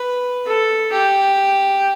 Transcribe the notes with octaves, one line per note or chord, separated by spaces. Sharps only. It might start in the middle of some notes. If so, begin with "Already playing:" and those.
Already playing: B4
A4
G4